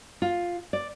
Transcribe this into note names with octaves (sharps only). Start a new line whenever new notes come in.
F4
D5